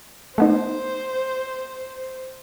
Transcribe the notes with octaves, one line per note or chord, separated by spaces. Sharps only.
A3 B3 D#4 C5